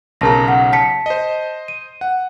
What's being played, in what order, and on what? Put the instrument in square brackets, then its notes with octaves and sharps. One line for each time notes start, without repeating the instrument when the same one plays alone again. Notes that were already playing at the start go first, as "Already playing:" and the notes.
[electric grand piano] B1 C#3 A#5 [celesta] A#4 A5 A#6
[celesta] F#5
A5 B6 C#7
[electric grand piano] C5 D#5
[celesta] D#7
[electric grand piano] F#5